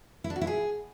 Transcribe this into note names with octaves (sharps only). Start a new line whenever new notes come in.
E4
D4
F#4
E4
G#4